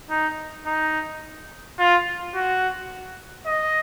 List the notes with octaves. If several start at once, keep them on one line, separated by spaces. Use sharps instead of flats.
D#4
D#4
F4
F#4
D#5